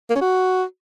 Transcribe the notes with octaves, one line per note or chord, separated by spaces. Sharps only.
A#3
C#4
F#4